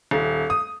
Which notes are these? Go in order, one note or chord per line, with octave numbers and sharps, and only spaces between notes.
D#1
D#6